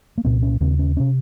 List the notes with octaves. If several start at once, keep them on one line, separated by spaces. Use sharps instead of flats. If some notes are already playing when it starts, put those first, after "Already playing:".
A#3
C2 A#2 C4
C#4
D#2 C#3 C4
C#4
C3 C#4